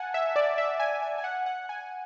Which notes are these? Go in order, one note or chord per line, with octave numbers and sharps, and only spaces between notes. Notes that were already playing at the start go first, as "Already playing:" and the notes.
Already playing: F#5 G#5 A5
E5
D5
E5
G#5
G#5
G#5
F#5
F#5
G#5